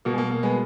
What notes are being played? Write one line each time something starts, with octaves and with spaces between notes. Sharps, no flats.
B2 A#3
G#3
A#3
A#3
G#3 B3